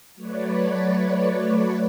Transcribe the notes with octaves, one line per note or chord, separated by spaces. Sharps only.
F#3 A3 B4 C#5 D5